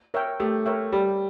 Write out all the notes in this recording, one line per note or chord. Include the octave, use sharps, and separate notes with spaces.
A#4 C#5 E5 G5
A3 G4
A#4 C#5 E5 G5
G3 G4